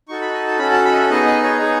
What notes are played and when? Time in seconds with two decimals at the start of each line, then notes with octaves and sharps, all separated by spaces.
0.08 D#4 F#4 A4 C#6
0.21 B5
0.34 D#5
0.47 A5
0.59 C#4 F#4 A4 B5
0.72 A5
0.85 B5
0.93 D#5
0.97 E5
1.10 B3 D#4 G#4 D#5
1.27 D#5
1.43 C#5
1.61 B3 D#4 G#4